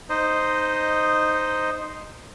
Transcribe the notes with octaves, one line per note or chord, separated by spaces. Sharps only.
D#4 C5 D#5